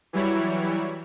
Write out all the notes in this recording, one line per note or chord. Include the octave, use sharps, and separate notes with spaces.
E3 F#3 G3 E4 C#5